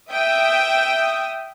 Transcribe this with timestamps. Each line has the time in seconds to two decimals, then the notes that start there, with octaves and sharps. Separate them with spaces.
0.11 E5 G5 D#6